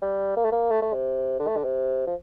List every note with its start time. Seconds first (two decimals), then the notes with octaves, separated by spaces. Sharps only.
0.02 G3
0.37 A#3
0.44 A3
0.52 A#3
0.71 A3
0.82 A3
0.93 C3
1.39 D3
1.47 A3
1.56 D3
1.64 C3
2.07 F3